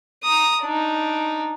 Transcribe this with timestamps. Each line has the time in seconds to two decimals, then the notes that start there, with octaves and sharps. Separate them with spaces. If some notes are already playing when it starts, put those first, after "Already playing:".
0.23 A#5 D#6
0.62 D4 D#4